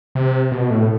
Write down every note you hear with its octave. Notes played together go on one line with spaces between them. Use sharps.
C3
B2
A2